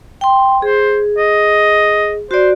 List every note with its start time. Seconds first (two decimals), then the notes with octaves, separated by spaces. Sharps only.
0.21 G5 C6
0.62 G#4 C5
1.18 D#5
2.31 F#4 C5 D5